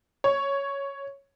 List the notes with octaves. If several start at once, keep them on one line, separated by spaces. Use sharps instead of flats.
C#5